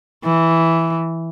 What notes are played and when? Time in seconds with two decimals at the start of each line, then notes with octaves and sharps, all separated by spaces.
0.25 E3